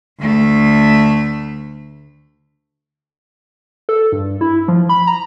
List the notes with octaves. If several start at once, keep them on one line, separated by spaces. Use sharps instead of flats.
D2 A3
A4
G2
E4
F3
B5
A#5